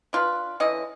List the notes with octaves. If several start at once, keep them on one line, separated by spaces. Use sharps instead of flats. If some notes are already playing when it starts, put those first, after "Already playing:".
D4 F4 B4
D3 E3 C#4 D#5